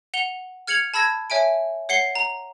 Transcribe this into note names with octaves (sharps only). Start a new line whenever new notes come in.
F#5 F7 G7
F6 G#6 C#7 F7 F#7
A5 B5 E6 G#6 A#6
C#5 E5 G#5 D7
C#5 F#5 C7 G7
A#5